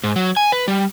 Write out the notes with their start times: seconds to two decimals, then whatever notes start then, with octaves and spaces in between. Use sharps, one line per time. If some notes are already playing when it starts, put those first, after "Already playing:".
0.04 G#2
0.16 F#3
0.37 G#5
0.52 B4
0.68 G3